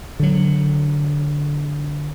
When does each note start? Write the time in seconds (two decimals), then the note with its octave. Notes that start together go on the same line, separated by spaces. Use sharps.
0.20 D3 F#3